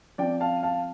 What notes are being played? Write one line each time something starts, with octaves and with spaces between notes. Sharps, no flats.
F3 C4 D5 G5
F5 A5
F5 A5